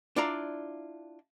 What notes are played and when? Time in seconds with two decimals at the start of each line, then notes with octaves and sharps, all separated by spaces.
0.16 D4 E4 F4 D5 F5 A#5